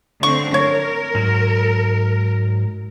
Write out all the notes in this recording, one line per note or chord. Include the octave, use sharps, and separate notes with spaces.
D3 A3 C4 C#6
A#4 C#5
G#2 F#3